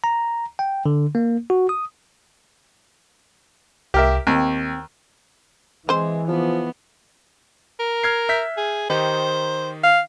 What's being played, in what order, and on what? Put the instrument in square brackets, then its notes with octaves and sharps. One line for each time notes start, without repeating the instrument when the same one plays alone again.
[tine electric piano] A#5
G5
D3
A#3
F#4
D#6
[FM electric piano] C2 F5 [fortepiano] G4 A#4 E5
[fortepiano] D#2 [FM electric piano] C4 G5
[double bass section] E3 [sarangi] G#3 [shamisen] C4 C5
[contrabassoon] F3 [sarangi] B3
[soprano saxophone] A#4
[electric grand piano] F6 G#6 C7
E5 G6 B6
[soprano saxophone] G#4
[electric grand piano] D#3 D#4 G4 [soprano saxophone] C5
[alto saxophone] F5